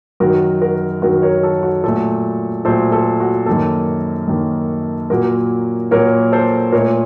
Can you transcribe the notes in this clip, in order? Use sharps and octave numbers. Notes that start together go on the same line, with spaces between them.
F#2 D#3 F#3 F#4 A#4
F#4 A#4
F#2 D#3 F#3 F#4 A#4
A#4 C#5
A4
F#4
A#2 F#3 A3 A4
A#2 F#3 A3 A4 C5
A4
F#4
F#2 D#3 A#3 A4
F#2 D#3 A#3
A#2 F#3 A#3 F#4 A#4
A#2 F#3 A#3 A#4 C#5
A4 C5
A#2 A#4 C#5
A3